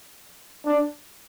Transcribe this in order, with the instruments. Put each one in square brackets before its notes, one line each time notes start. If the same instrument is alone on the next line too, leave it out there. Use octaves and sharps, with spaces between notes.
[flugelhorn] D4